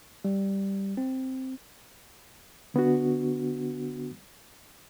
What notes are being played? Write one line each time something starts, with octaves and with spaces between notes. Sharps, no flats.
G3
C4
D3 B3 D4 F#4